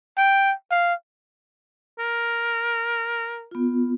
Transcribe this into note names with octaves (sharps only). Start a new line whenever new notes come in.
G5
F5
A#4
B3 F4